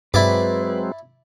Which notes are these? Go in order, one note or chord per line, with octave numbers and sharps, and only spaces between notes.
G2 F#3 G#3 C4 E4 B4 D5 D6